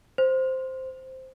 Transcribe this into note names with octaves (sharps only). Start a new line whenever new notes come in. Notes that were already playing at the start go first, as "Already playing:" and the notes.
C5